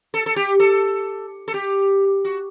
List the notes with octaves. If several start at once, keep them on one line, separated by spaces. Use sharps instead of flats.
A4
A4
G4
A4
A4
G4
F#4